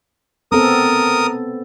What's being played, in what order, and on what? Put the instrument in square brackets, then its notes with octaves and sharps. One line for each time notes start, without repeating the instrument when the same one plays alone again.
[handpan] B3 C4 A4 [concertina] A#4 D#6